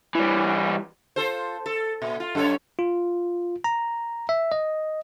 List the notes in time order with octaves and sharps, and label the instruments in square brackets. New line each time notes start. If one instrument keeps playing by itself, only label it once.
[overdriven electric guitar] E3 G3
[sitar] F4 A4 C5
A4
A#2
F4
F#2 A4 C#5
[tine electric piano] F4
A#5
E5
D#5